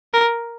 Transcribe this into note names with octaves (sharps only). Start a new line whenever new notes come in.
A#4